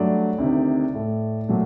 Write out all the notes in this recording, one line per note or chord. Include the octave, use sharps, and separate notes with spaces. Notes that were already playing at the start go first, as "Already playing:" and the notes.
Already playing: G2 F#3 A3 D5
D2 C3 D#3
A2 A3
A#2 F#3 A3